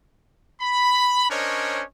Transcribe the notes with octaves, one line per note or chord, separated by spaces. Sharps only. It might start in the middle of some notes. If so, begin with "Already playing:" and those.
B5
C#4 D4 A#4 C5 C#5 D#5